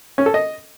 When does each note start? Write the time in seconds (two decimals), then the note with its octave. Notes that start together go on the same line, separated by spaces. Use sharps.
0.18 C#4
0.26 A4
0.34 D#5